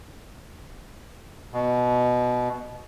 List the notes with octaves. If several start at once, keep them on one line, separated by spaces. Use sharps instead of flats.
B2